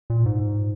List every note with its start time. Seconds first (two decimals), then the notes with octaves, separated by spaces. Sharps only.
0.10 A#2
0.26 G#2